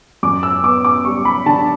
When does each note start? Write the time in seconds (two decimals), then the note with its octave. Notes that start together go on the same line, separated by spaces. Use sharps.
0.23 F#2 D6
0.43 E6
0.63 B3 D6
0.85 D6
1.05 G3 C#6
1.25 B5
1.46 D3 A5